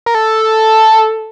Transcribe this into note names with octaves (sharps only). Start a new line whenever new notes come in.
A#4
A4